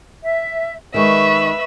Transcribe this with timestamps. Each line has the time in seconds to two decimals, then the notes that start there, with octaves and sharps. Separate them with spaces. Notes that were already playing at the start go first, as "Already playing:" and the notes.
0.22 E5
0.94 D#3 G#3 B4 E5 C#6